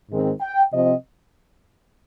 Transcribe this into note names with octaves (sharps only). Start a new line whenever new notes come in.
G#2 D#3 G#3 C4
G5
C3 F3 C4 D#5